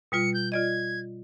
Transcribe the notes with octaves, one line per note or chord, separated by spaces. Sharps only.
B2 G3 F4 C#7
G6
F4 D5 D#5 G#6